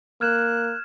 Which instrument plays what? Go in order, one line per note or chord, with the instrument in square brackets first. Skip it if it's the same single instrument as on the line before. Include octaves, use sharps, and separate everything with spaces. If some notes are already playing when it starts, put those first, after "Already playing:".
[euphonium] A#3 [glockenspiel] F6 G#6 E7 [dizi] F#6